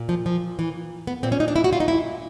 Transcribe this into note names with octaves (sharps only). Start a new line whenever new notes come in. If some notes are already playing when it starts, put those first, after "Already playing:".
Already playing: A#2
F3
F3
E3
B3
A#2 C4
C#4
D#4
D4
E4
F#4
F4
D#4
E4